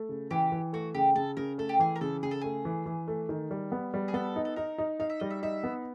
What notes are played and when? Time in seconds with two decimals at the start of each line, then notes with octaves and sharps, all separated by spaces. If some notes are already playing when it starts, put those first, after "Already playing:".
Already playing: A3
0.09 C#3
0.31 E3 G4
0.52 E3
0.73 A3 F#4
0.94 C#3 G4
1.16 C#3 A4
1.37 C#3 A#4
1.58 A3 A4
1.69 G4
1.79 E3 G#4
1.96 A#4
2.01 C#3 A4
2.23 C#3 G#4
2.31 A4
2.41 A3 G#4
2.65 E3
2.86 E3
3.08 A3
3.29 D#3
3.51 G3
3.72 B3
3.94 G3
4.08 G#4
4.14 B3 A4
4.36 D#4
4.45 A4
4.56 D#4 A#4
4.78 D#4
5.00 D#4 F5
5.10 E5
5.20 G3 D#5
5.30 E5
5.43 D#4 E5
5.64 B3